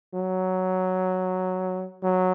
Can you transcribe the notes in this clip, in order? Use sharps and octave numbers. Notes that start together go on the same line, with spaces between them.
F#3
F#3